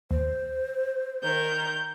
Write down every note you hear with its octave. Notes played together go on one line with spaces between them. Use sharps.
D#2 C5
D#3 A#4 G6